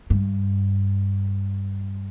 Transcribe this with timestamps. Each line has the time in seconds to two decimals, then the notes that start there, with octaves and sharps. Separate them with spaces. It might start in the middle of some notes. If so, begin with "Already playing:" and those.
0.10 G2